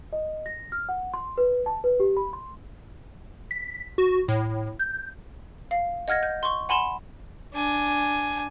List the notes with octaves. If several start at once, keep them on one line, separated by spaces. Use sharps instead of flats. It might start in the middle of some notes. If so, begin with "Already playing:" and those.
D#5
A#6
F6
F#5
C6
B4
A5
B4
G4
B5
C6
B6
F#4
A2
G6
F5
D#5 F#5 F6 G#6 A#6
G6
C6 C#6
F#5 G#5 B5 C6 E7
D4 G#5